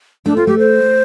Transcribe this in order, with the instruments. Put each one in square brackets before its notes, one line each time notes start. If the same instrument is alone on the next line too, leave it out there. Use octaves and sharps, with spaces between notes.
[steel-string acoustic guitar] A3 [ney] D4
[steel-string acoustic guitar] C4 [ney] F4
[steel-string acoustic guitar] A3 [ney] G4
[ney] C5